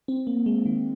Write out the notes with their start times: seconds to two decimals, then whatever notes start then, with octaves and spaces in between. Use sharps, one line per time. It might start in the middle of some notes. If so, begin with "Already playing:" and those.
0.08 C4
0.27 A#3
0.46 G#3
0.65 D#3